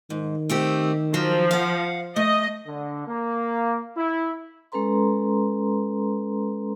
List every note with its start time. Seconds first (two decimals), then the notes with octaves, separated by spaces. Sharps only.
0.10 G#2 D#3
0.50 A3 C4 G4
1.14 F3 F#3
1.51 F5 F#5
2.16 A3 D#5
2.67 D3
3.07 A#3
3.96 E4
4.72 G#3 C#4 A4 B4 A#5 C6